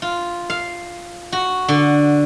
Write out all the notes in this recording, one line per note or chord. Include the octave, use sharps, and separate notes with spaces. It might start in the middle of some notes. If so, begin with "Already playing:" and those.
F4
F5
F#4
D3